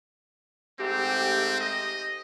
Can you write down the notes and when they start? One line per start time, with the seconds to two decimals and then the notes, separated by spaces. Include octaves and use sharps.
0.80 G#2 A3 C4 G4
1.61 D#5